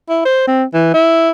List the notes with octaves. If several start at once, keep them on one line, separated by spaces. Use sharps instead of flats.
E4
C5
C4
E3
E4